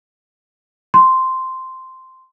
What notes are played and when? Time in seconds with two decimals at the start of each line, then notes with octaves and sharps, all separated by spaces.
0.94 C6